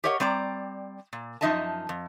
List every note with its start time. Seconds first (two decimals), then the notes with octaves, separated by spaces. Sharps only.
0.04 G4 A#4 C#5 D#5 E5 F#5
0.20 G3 C4 D5 A#5
1.13 A#2
1.41 F#2 F3 D#4 D#5 E5 A5
1.89 F2